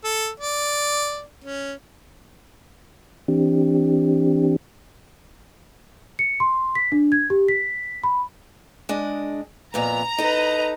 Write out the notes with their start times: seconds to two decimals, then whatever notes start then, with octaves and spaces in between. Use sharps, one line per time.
0.04 A4
0.40 D5
1.44 C#4
3.28 E3 C4 D4 G4
6.19 C#7
6.40 C6
6.75 B6
6.92 D4
7.12 G#6
7.30 G4
7.48 B6
8.04 B5
8.89 G#3 D4 D#5
9.74 F2 A#2 B3 A#5
10.18 D#4 A4 B4 D#5